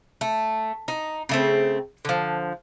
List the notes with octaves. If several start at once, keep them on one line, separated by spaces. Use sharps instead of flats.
A3
D#4
C#3 A3 C4
D3 F3